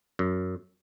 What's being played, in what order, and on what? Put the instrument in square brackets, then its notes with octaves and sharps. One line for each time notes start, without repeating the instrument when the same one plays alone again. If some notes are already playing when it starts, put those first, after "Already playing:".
[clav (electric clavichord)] F#2